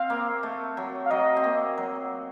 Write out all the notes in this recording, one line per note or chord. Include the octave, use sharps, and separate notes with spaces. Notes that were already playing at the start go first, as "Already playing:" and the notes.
Already playing: C4 F5
A#3
A3
F#3
F5
F#3 D#5
C4
A#3
F#3